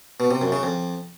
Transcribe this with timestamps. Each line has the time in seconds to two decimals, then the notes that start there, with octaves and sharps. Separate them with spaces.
0.20 B2
0.31 C3
0.41 F#2
0.52 C#3
0.63 F2